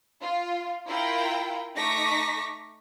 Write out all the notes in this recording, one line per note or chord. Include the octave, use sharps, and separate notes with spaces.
F4
E4 F4 A#4 G5
A3 D#4 C#6 D6 A#6 B6